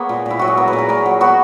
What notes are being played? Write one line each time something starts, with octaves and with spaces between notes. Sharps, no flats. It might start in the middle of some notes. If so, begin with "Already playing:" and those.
Already playing: A#3 B3 G#4 C#5
A#2
A#2 E4
F#3 F#4
G#4
B3 A#4
B4
A#2
A#4
A#2 A#4
F#3
B3 F#4